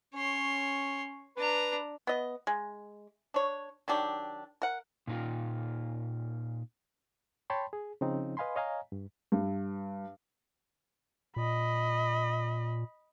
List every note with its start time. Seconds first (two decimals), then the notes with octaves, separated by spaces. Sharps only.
0.14 C#4 C#5 C6
1.37 D4 B4 A#5
2.07 B3 D#5
2.47 G#3
3.34 D4 C#5
3.88 D#3 F#3 D4 G4
4.62 A#4 F#5
5.07 A#2 D#4 F4
7.50 C#5 G5 A5 B5 C6
7.73 G#4
8.01 C#3 F3 C4 D#4
8.37 B4 D#5 F5 G#5 B5 C6
8.56 C#5 D#5 F5 G#5 A#5
8.92 G2
9.32 G2
11.36 A#2 D#5 B5